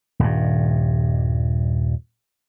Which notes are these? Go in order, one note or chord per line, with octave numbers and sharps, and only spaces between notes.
D#1 G2